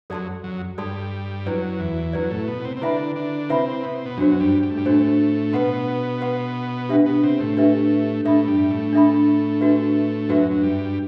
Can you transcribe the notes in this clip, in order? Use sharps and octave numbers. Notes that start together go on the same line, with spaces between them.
F#2 F#3 A4 D5 A5 C6
F#2 F#3
G2 G3 A4 D5 A5 C6
F#2 F#3 E4 B4 D5
E2 E3
F#2 F#3 E4 B4 D5
A2 A3
B2 B3
C3 C4
C4
D3 D4 E4 B4 E5 G5 B5
D3 D4
C3 C4 E4 B4 E5 G5 B5
B3
C4
B2 B3
F#2 F#3 D4 F#4 C5
G2 G3
G3
A3
G2 G3
A2 A3 D4 F#4 C5
B2 B3 B4 F#5 C6
B4 F#5 C6
D4 G4 B4 E5 G5
B2 B3
C3 C4
A2 A3
D4 G4 B4 E5 G5
A2 A3 D4 A4 E5 B5
G2 G3
A2 A3
D4 A4 E5 B5
D4 F#4 B4 E5
F#2 F#3 D4 F#4 B4 E5
F#3
G2 G3